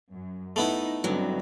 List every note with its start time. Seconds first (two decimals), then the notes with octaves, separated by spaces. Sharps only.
0.12 F#2
0.56 A3 B3 D#4 E4
1.04 G2 D3 F#3 C4 D#4